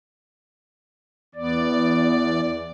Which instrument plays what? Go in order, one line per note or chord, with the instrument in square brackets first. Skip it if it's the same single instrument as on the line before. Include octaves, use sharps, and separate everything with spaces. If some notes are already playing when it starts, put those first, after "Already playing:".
[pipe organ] E2 D5 [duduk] B3